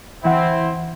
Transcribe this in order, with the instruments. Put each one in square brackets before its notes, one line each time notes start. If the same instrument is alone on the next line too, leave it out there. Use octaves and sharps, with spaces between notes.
[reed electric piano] D2 E3 F#5 [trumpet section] C4 E4